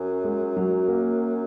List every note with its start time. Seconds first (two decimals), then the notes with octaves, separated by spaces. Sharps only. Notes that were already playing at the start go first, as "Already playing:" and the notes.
Already playing: F#2
0.24 G#3
0.57 F#3
0.88 A#3